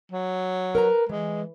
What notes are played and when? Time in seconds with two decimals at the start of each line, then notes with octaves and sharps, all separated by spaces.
0.12 F#3
0.75 A#4 B4 A#5
1.09 E3 G#3